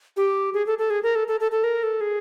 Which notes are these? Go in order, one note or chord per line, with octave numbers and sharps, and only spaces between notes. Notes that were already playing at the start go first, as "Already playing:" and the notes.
G4
G#4
A4
A4
G#4
A#4
A4
A4
A4
A4
A#4
A4
G#4